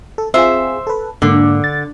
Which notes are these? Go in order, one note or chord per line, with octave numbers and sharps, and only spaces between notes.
A4
C4 F4 G#4 C5 E5
A4 B4
G#2 D3 A#3
A6